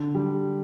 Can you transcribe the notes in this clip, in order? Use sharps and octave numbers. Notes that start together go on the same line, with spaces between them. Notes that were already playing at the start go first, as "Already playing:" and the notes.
Already playing: D3
G3